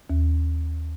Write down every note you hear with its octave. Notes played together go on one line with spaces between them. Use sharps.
D#2